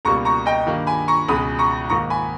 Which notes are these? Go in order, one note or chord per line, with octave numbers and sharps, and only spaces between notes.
C#2 B2 G3 A#3 A#5 C#6
A#5 C#6
D#5 G5
G2 D#3 A#3
G#5 B5
A#5 C#6
C#2 B2 G#3 B5 D#6
A#5 C#6
G#2 D#3 A#3 A#5 C#6
G#5 B5